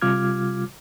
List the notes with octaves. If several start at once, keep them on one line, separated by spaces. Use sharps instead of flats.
C3 G3 F4 D6 F6 G#6